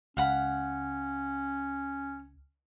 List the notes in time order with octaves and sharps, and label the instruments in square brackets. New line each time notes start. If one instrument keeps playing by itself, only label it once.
[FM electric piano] C#2 [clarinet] C#4 [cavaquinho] F5 F#5 B5